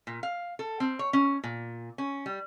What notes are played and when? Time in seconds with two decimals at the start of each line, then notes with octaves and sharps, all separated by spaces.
0.07 A#2
0.23 F5
0.59 A4
0.80 C4
0.99 C#5
1.13 C#4
1.44 A#2
1.98 C#4
2.26 G3